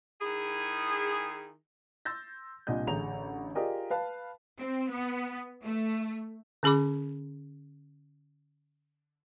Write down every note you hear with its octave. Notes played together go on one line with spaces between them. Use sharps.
D#3 E4 G#4
C6 E6 G6 A6 A#6
C2 A#2 D4 D#5 G6
A1 D3 G#4 A#5 F7
F4 G4 G#4 A#4 D5 D#5
B4 F5 A5
C4
B3
A3
D3 C#4 G#4 B5 D6